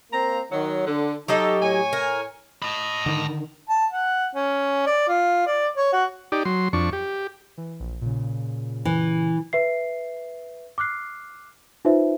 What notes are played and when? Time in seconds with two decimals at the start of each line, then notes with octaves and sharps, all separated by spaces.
0.12 A#3 C4 A#5
0.52 D#3 F#3
0.87 D3
1.28 F#3 D#4 G4 A4 D#5
1.62 A2 C#5 G#5
1.93 A#4
2.62 D#5 A5 B5
3.06 D3 D#3
3.69 A5
3.92 F#5
4.35 C#4
4.86 D5
5.08 F4
5.46 D5
5.77 C#5
5.93 F#4
6.32 D#4 G4 D5
6.45 F#3 C6
6.73 F2 D4 C#6
6.93 G4
7.58 E3
7.80 A#1
8.01 A#2 C#3
8.85 E3
9.53 B4 E5 C7
10.78 D6 F6 F#6 C7
11.85 D#4 F4 B4 C5 E5